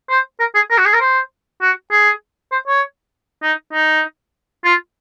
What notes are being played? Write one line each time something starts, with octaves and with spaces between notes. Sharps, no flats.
C5
A#4
G#4
A#4
F#4
G#4
A#4
C5
F#4
G#4
C5
C#5
D#4
D#4
F4